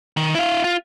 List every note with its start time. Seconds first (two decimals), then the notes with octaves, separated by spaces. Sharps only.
0.17 D#3
0.35 E4 F5
0.64 F4